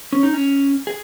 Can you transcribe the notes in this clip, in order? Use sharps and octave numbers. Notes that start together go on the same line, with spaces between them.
C#4
D#4
C#4
G#4